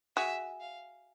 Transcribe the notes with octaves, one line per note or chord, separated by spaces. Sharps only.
F#4 G#4 E5
F5